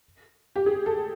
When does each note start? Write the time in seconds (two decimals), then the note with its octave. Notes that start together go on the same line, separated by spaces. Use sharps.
0.56 G4
0.66 G#4
0.86 A4